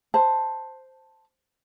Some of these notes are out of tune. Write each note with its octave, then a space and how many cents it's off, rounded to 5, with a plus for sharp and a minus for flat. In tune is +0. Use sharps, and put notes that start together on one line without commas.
C5 +0 A5 +0